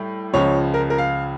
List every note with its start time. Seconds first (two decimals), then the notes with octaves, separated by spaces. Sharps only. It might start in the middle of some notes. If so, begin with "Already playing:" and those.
Already playing: A2 G3
0.33 C#2 C#3 F3 C#5
0.74 A#4
0.90 A#4
0.98 F5